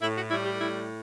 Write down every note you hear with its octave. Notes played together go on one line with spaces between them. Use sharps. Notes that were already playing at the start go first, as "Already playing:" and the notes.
A2 E4
F#4
G3 E4
G4
A2 E4